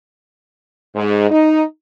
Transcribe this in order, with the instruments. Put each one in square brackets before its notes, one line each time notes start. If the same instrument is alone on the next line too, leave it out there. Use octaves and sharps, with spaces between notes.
[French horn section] G#2
D#4